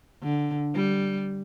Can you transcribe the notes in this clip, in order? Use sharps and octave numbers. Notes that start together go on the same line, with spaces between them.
D3
G3